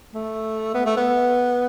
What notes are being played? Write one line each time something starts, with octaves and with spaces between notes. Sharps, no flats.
A3
B3
A3
B3